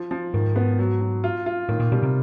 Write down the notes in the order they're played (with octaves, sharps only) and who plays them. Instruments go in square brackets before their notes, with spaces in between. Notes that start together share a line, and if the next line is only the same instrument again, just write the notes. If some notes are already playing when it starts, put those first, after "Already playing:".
Already playing: [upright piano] F3
F3
[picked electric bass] G#2 [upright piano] D#3
[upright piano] B3
F#3
F#3
F4
F4
[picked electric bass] A2 [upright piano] D#3
[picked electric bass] A#2
[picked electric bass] B2 [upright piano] G3
[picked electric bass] C3